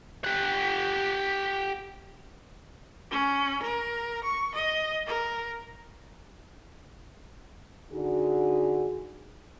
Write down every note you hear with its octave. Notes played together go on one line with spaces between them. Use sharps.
G4 F#5
C#4
A#4
C#6
D#5
A#4
D3 D#4 F#4 G#4